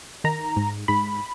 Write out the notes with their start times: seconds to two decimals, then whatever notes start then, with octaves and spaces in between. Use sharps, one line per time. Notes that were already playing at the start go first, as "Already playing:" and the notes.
0.24 D#3 A#5
0.56 G#2
0.88 G#2 B5